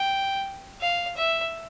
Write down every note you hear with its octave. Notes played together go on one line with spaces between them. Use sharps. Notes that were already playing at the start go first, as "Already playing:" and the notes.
Already playing: G5
F5
E5